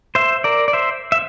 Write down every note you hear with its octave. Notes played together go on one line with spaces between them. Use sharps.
C5 E5
A#4 D5
D5
C5 E5
E5